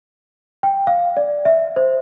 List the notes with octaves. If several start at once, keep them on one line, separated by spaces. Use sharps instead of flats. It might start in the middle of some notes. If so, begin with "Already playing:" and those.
G5
F5
D5
E5
C5